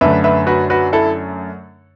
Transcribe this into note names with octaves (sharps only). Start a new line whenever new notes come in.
F#2 D3 A3 B4 E5
B4 E5
F#4 B4
F#4 B4
E4 A4